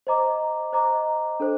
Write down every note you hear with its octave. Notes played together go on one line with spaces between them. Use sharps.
C5 D#5 A#5 D6
C5 D#5 A#5 D6
D4 A4 C5